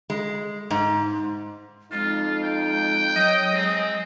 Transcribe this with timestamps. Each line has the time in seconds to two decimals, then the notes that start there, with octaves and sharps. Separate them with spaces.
0.10 G#3
0.71 G#2
1.92 F2 G#3 D#4 F4
2.43 G5
3.15 F#3 D#5
3.53 G#3 C4